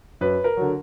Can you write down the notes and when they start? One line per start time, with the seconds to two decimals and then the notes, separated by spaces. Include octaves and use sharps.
0.21 F#2 B4
0.44 A#4
0.57 D3 F#3